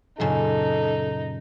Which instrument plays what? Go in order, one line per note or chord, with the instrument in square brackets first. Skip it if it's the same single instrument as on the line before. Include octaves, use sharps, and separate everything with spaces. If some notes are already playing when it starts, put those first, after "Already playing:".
[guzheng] F#2 A#2 C#3 [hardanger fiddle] D#4 [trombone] A4